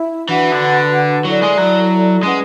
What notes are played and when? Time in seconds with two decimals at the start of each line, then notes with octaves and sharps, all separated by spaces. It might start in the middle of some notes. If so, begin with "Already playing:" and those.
Already playing: E4 E5
0.28 E3 D4 F#4 B4 F#5
0.52 D3
1.25 F#3 E4 A4 D5
1.42 G#3
1.58 F#3
2.23 G#3 C#4 E4 B4 F#5